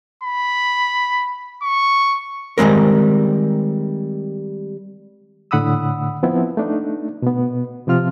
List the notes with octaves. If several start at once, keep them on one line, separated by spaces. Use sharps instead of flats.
B5
C#6
D#3 G3 G#3 C4 A#4
A2 D3 F#5 B5 D#6 E6
F3 B3 C4 E4
A3 D4 D#4
B2 B3
C3 F3 C4 F4 F6